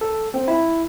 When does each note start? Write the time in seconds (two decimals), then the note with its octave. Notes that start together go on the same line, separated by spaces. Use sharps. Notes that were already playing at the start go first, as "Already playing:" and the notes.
0.01 A4
0.34 C4
0.48 E4